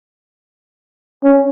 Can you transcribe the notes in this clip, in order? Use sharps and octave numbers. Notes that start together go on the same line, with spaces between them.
C#4